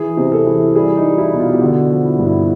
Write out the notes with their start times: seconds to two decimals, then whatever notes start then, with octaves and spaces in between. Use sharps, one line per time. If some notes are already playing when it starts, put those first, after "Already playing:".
Already playing: E3 G#4
0.17 C3
0.32 A4
0.46 E3
0.75 G3 G#4
0.97 D#4
1.04 G3
1.18 E4
1.33 B2
1.40 F4
1.52 G4
1.61 D3 F#4
1.90 F3
2.04 E4
2.19 G2
2.26 E4